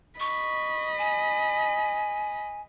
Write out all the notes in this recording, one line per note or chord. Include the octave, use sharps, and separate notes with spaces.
D#5 B5 C#6
G#5